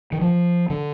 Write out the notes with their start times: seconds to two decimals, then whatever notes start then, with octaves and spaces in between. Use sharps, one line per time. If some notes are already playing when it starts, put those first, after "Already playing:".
0.12 D#3
0.21 F3
0.70 D3